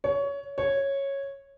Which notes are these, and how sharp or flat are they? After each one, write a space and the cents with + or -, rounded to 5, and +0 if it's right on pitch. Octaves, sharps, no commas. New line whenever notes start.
C#5 +20
C#5 -10